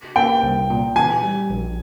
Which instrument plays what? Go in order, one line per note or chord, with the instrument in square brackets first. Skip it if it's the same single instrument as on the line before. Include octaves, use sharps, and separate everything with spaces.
[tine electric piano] A#3 [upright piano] G5
[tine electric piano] C2
A#2
[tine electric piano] E3 [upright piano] G#5
[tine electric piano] G3
A#1